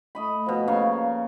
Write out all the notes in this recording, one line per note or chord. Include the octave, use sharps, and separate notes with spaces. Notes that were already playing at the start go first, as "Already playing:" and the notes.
A3 D#5 B5
B2 F3
C#3 A#3 C#5 F5